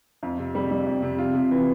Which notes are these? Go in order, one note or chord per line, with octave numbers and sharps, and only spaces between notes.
F2
C3
G3
G3
F2
C3
F4
C3
E3